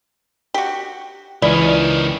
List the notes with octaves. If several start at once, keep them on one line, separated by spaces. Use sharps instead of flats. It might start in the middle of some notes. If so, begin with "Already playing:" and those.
F#4 G4
C#2 D#3 E3 C#4 E4 D5